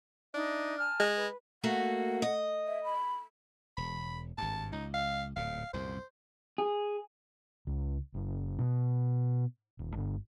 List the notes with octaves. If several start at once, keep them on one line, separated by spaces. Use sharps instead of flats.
D4 D#4 E5
G#5 A5 F6
G#3
B4
A3 A#3 F#4 F#5
D#5
E5
B5
E1 B5
G#1 G2 A5
C#2 D#4
F5
D1 A#2 F5
C2 F#2 A#2 C5
G#4
C#2
F#1
B2
D#1
G1